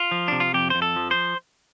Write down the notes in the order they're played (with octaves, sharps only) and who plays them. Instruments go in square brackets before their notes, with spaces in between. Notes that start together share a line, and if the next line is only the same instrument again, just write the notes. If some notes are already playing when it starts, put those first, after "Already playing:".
Already playing: [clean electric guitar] F4
F3
C3 D4
F4
F2 G4
F2 C5
A4
F3
C5